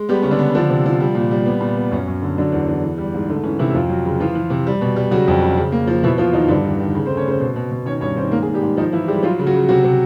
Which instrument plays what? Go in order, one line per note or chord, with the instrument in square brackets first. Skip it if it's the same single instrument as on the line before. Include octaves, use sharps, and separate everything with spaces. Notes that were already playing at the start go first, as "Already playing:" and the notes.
Already playing: [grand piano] G#3
G3 B3 G4
C#3 C#4
D3 D4
B3
D3 F3 D4
C3
F3
G3
A#2
G3
B3
A#2
B3
F#2 C#4
F#2
D3
D3 F#3 D4
E2
E2
E3
G3
G#2
D3 A3 D4
E3 C#4
C3 E3 E4
F2 F3 F4
F#3
C#3
E3 F3 F4
E3
C3
G3
B2
G3
C#3 F#3 F#4
F2
C#3
C#3
A#3
F3
B2 E3 E4
B2 F3 F4
E2 D#3 D#4
G2 D3 D4
D#3
D#3
C#3
C4 C5
A3
C#4 C#5
C#3 C4 C5
B2
B2
B2
D#3 C#4 C#5
G2 C#4 C#5
D#3 C4 C5
G#2 A#3 A#4
G#3 G#4
G#2
G3 G4
G#2
D#3 F3 D#4
E3 F3 E4
G3 G#3 G4
F3 F#3 F4
C#3
F#3 F#4
C#3
C3 F#3 F#4
C3